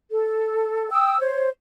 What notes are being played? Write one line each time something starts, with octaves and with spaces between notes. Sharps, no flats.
A4
G5 D#6 E6
C5 C#5